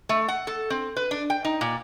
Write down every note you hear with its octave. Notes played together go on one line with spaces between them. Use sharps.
A3
F#5
A4
C4
B4
D4
G5
D#4
A#2